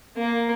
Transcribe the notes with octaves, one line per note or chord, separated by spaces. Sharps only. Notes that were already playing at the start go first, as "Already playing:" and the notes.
A#3